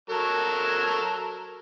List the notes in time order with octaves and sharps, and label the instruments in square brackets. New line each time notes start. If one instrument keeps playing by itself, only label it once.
[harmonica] F#3 A4 A#4